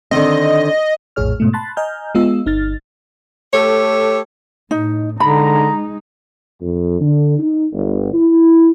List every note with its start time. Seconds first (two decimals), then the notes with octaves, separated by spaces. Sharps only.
0.11 D3 D#3 C4 D#5
1.16 A#1 F2 A2 G#4 C#5 F6
1.40 G#2 B2 A3
1.53 A5 B5 C6 F#6 A6
1.77 D#5 G#5 A#5 F6 G6
2.15 G#3 B3 F4 D#5 E6
2.46 G1 D#4 F6 A6
3.54 A3 G4 A4 C#5
4.71 A2 D#4
5.20 D3 G#3 D#4 A#5 B5
6.61 F2
7.01 D3
7.39 D#4
7.73 G1
8.14 E4